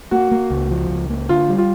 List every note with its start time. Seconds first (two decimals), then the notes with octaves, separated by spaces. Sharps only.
0.11 A#3 F#4
0.31 A#3
0.50 C#2
0.71 F3
0.89 C#2
1.10 A#3
1.29 D3 F4
1.49 G3
1.58 F4